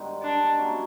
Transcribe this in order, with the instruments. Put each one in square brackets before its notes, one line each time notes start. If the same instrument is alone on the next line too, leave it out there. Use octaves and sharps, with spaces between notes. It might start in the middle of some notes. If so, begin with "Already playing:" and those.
Already playing: [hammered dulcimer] G2 D#3 G#3 B3
[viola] D4
[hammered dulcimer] F#3 A#3 C#4 E4